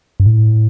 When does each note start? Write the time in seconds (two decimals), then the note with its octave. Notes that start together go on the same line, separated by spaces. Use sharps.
0.20 G2
0.26 A2